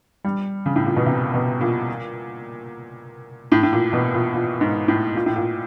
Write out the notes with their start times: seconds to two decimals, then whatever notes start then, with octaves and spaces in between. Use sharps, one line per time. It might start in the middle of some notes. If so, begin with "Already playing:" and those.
0.24 G3
0.66 C#3
0.76 A2
0.86 A#2
0.96 B2
1.06 C3
1.34 B2
1.61 A#2
3.52 A2
3.63 A2
3.73 A#2
3.93 B2
4.14 A#2
4.34 A#2
4.61 G#2
4.88 A2
5.15 A#2
5.26 A2
5.36 A#2